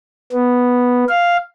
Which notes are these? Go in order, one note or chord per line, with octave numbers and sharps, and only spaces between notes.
B3
F5